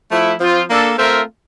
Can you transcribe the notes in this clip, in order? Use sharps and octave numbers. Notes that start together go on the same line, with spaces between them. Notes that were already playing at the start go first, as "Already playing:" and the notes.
F3 A3 E4
F3 C4 F4
A#3 D4 A4
A3 C4 F4 A#4 E5